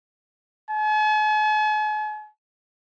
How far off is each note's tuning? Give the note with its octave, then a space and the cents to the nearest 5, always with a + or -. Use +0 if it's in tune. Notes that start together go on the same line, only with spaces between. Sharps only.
G#5 +45